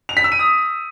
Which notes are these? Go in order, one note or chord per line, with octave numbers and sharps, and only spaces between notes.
F7
B6
E6
D#7
D#6